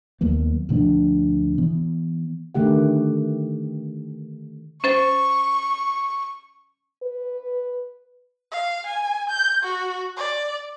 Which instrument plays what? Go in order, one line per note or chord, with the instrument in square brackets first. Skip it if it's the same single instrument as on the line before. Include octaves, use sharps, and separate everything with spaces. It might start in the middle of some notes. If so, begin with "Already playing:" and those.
[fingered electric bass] D#2 F#3 A#3 B3
D2 B2 F3 D4
E3 B3
[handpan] D3 D#3 A3 G4 F#5
[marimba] C#4 C5 A6 [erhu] C#6
[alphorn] B4
[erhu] F5
G#5
G6
F#4
D5